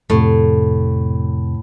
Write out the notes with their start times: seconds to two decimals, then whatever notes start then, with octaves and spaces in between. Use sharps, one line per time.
0.10 F2 A2 C3